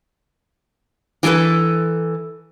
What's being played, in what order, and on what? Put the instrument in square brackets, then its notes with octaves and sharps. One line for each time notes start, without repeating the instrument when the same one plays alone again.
[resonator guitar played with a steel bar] E3 G3 A3 A4 B4